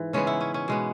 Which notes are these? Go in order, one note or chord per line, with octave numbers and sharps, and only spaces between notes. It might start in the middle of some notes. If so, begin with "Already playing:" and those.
Already playing: G#2 E3
C#3 G#3 B3 C#4
E4
C#4
C#4
B2 G#3 B3